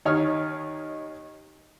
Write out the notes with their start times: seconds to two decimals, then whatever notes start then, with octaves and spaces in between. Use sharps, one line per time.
0.05 D#2 D#4 C#5 F6